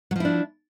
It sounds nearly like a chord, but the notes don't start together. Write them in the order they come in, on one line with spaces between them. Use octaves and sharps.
F#3 F3 E4 D4